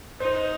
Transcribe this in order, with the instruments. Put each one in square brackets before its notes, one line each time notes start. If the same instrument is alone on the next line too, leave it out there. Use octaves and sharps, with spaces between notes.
[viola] D#4 [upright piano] C5